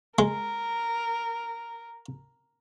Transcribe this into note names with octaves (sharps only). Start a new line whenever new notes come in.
G#3 A#4